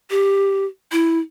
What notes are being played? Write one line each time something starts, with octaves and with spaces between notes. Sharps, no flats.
G4
E4